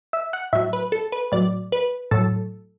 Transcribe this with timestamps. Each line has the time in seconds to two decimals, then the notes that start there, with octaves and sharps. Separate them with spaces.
0.13 E5
0.33 F#5
0.53 A2 F#3 E5
0.73 B4
0.92 A4
1.12 B4
1.32 A2 F#3 D5
1.72 B4
2.11 A2 F#3 A4